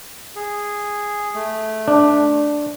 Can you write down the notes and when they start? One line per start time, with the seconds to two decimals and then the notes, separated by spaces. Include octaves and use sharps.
0.36 G#4
1.35 A3
1.88 D4